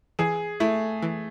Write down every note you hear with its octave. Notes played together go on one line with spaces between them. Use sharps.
E3 G#4
A3 E4
E3